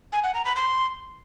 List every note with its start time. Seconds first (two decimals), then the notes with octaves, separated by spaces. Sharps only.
0.13 G#5
0.23 F#5
0.34 A#5
0.45 B5
0.56 C6